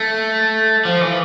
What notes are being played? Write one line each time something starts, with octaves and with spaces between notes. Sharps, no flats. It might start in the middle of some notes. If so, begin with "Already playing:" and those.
Already playing: A3
F3
E3